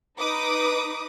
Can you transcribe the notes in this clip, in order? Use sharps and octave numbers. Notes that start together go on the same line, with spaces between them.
D#4 B4 D6 D#6